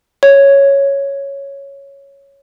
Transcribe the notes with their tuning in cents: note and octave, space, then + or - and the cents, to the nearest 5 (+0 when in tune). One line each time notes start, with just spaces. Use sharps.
C#5 +0